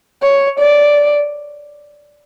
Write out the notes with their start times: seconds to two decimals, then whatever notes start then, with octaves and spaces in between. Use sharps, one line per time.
0.22 C#5
0.59 D5